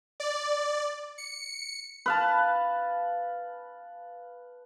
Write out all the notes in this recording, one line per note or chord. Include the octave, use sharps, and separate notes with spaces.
D5
C#7
B4 F5 A5